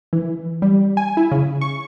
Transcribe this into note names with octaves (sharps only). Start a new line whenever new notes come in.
E3
G3
G#5
E4
C#3
C#6